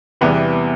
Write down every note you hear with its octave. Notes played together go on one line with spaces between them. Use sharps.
E2 C3 E3 G3 B3 B4